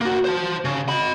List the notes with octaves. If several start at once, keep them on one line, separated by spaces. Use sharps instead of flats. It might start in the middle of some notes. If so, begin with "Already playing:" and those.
A#3 F#4
C5 A5
C#3
D#5 B5